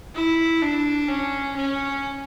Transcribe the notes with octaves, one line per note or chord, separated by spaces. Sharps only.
E4
D4
C#4
C#4